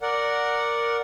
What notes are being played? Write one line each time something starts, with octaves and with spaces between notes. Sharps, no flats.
A#4 D5 F#5